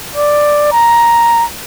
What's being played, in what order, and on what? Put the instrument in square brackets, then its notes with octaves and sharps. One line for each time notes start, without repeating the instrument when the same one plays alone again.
[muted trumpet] D5
A#5